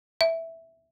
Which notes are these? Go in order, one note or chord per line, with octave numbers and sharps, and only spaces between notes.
E5